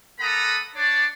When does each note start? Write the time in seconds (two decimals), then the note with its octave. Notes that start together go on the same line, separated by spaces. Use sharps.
0.19 A#3 A4 F#5 A#5 B5 D#6
0.74 D4 C#5 D5